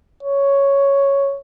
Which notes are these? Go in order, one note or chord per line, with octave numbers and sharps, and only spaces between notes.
C#5